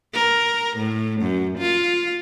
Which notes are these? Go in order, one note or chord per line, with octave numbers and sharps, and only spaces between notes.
A#4
A2
F#2
F4